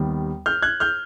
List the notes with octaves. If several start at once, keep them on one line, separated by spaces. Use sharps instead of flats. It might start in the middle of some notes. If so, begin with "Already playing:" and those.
Already playing: D#2 D#3 G3 B3
F6 G6
F#6 G#6
F6 G6